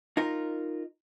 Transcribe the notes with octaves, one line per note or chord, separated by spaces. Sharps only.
D#4 F4 A#4